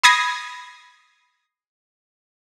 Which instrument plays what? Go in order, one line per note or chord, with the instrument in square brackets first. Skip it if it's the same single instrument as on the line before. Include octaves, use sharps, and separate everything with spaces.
[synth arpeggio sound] B5 D#6 G#6 A#6 C7